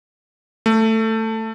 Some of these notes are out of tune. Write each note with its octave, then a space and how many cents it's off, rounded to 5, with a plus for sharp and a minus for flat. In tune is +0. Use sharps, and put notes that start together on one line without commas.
A3 +15